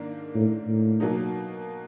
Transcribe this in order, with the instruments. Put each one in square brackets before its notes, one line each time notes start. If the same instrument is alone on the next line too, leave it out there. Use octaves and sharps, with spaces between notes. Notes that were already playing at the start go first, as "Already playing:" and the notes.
Already playing: [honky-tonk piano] G#2 D#3 A#3 D4
[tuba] A2
A2
[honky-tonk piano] B2 F#3 A#3 D#4